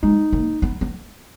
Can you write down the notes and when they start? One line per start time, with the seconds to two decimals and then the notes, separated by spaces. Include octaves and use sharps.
0.03 G#3 D#4
0.33 A#3
0.62 B3
0.81 B3